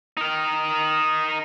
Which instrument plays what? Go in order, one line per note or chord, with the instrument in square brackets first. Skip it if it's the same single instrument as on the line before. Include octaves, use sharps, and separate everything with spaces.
[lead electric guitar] D#4 A#4